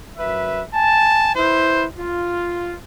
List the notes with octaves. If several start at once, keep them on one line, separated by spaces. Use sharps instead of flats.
F#2 B4 E5
G#5 A5
E4 B4 C5
F4